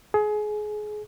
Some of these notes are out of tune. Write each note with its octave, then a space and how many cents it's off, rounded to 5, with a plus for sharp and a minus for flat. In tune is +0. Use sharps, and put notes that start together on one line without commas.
G#4 +25